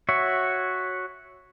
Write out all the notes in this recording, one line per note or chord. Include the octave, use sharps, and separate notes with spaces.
F#4 C#5 E5